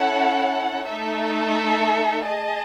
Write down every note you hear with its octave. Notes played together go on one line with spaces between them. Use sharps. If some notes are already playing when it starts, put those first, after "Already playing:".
Already playing: C#4 E4 A4 C#5 F#5
A3 D#4 A4 E5
G#4 D#5 A5